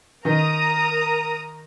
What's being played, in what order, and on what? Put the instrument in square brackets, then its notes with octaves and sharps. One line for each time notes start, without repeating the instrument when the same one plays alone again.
[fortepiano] D#3 [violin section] A#4 A#5 D#6